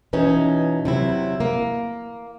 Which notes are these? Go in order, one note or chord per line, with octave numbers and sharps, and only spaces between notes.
B2 E3 C#4 D#4
C3 F#3 E4
A#3